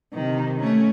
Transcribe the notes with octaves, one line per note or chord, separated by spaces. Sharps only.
C3 D#3
A3 C#4